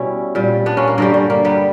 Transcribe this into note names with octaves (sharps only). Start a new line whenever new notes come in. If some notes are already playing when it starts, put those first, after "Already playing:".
Already playing: B2 G3 C#4 E4
A#2 G3
B3 D4
A#3 C#4
A#3
G2 D3 G3 A#3
G3
A#3
G3 B3